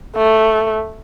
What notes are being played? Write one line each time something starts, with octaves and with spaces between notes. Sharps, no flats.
A3